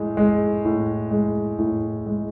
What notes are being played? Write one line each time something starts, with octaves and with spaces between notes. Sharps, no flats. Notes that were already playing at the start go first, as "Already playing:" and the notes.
Already playing: A2 G#3
G#3
A2
G#3
A2
G#3